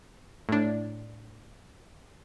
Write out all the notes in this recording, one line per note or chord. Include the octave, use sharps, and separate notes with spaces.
A2 D4